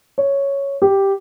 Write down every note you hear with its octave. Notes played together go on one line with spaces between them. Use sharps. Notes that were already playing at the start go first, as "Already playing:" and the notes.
C#5
G4